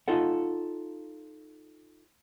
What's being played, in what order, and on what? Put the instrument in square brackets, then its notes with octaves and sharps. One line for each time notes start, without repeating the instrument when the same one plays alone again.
[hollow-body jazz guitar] D#4 F4 A4 F#5